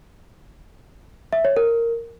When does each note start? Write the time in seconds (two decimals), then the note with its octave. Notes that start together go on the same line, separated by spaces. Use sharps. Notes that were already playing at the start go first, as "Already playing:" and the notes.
1.33 E5
1.45 C#5
1.57 A#4